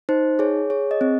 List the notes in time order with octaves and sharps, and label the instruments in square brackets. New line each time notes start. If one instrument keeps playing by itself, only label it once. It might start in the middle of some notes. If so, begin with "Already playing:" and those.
[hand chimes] D#4 C5
G#4 C#5
G#4 C#5
D#5
C4